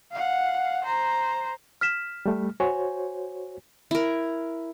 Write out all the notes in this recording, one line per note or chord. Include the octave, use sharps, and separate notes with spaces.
F5 F#5
C5 A#5
F6 B6 E7
G3 A3
F#4 C5 C#5 G#5
E4 A#4